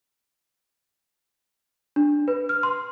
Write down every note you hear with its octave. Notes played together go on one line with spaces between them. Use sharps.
D4
B4
F6
C6